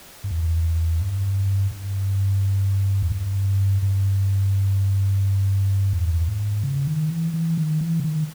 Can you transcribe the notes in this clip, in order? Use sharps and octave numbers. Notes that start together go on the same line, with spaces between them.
G2
E2
G2
G2
E2
G2
G2
E2
G#2
C#3
D#3
E3
E3
D#3
E3
C#3
D#3